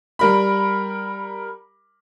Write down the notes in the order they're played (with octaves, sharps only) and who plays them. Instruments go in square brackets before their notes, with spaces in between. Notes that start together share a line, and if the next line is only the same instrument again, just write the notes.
[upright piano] G3 A#4 B5